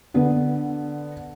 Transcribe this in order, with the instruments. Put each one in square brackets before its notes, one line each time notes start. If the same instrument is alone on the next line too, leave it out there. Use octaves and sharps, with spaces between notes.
[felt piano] D3 B3